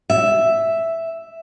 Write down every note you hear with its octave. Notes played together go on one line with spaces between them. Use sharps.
E5